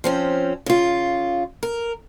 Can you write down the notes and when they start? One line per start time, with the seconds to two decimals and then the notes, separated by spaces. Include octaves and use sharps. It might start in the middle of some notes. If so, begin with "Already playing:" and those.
0.04 F3 C4 C#4
0.66 C#3 F4
1.63 A#4